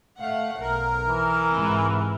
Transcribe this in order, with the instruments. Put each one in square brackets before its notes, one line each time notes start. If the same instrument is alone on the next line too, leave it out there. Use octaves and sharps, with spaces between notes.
[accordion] A3 [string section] F5 F#5
[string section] B1 [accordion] A#4
[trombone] E3
[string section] G#2 C3